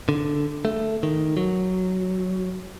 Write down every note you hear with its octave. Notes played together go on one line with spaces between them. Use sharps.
D3
A3
D#3
F#3